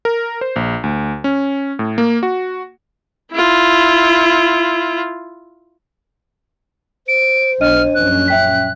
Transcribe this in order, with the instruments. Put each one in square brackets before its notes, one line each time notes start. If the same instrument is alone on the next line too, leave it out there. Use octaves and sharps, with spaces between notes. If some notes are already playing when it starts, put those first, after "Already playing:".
[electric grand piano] A#4
C5
A#1
D2
C#4
A2
A#3
F#4
[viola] E4 F4
[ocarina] C5 [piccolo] D7
[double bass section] B1 [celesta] D4 D#5 D#7 [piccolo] F6
[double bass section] A#1 F#2 C#4 [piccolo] F#6
[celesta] E5 G5 B6